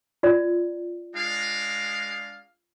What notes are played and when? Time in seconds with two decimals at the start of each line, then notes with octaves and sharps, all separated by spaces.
0.23 F4 D5
1.14 G#3 D4 F5